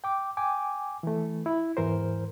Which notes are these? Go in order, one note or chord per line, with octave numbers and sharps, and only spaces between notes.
G5 D6
G5 G#5 D6
E3 A3
E4
E2 G#2 E3 A#4 C5